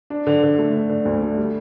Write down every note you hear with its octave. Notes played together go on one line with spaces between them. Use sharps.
D4
D3
D3
A3
D3
D3
D2
A3
G3